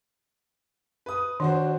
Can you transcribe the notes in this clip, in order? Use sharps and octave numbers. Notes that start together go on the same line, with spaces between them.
B4 D#6
D#3 D4 F#4 C5